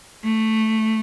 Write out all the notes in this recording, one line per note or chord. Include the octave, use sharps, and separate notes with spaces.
A3